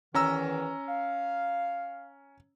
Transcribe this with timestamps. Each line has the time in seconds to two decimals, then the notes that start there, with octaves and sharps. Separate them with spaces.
0.15 E2 D#3 E3 C#4 A#5 E6
0.89 F5